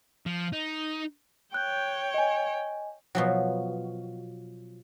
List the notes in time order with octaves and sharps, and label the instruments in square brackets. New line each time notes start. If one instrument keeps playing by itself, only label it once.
[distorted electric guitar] F3
D#4
[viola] C#5 G5 [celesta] F#6 G6
[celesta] D#5 G#5
[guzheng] B2 F3 F#3